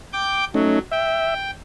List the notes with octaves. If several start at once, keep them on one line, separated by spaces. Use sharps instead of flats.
G5 D6 G6
F#3 A3 C#4 D#4
E5 G5